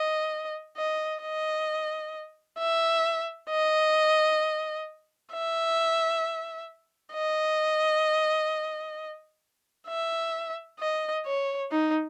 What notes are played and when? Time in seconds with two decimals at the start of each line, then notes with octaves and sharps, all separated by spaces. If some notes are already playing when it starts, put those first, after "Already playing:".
Already playing: D#5
0.77 D#5
1.21 D#5
2.58 E5
3.50 D#5
5.32 E5
7.14 D#5
9.88 E5
10.80 D#5
11.26 C#5
11.72 D#4